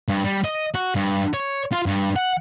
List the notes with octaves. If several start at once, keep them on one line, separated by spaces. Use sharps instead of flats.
G2
G3
D#5
F#4
G2
C#5
F4
G2
F#5